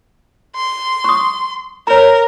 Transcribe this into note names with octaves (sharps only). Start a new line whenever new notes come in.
C6
C#6 D#6
A#4 C#5 A#5